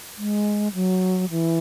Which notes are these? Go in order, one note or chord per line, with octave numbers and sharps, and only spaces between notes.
G#3
F#3
E3